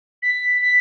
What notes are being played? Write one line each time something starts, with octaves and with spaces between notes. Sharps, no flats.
B6
B6